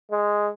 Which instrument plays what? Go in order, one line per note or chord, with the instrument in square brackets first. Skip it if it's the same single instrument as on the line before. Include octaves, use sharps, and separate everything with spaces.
[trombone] G#3